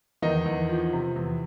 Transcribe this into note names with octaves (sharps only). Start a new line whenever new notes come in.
E2 D#3 D#4
E2
F3
C3
E2